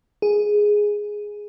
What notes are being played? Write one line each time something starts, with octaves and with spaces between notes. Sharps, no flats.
G#4